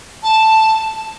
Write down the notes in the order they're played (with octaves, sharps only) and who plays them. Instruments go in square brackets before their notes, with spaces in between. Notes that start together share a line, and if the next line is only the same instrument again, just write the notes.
[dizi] A5